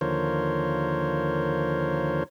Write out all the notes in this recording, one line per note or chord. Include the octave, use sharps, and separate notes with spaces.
D#2 D3 F3 A#4 C5 C#5